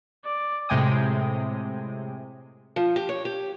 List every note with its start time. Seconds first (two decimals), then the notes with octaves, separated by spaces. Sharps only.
0.24 D5
0.69 A2 C3 G#3 G5 G#5 D#6
2.76 F3
2.96 G4
3.09 C#5
3.25 G4